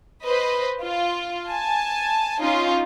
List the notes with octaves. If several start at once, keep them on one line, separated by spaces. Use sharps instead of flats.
B4 C5 D#5
F4
G#5 A5
C#4 D#4 F4